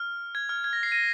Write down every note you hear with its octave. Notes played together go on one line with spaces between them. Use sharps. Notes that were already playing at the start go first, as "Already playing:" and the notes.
Already playing: F6
G#6
F6
G#6
A#6
C7
A#6 D#7